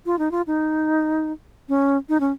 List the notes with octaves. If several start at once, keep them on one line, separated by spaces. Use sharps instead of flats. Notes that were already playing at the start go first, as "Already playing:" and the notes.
F4
D#4
F4
D#4
C#4
D#4
C#4